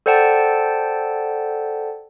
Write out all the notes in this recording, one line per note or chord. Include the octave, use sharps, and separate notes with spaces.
A4 C5 D5 F#5 G5 A5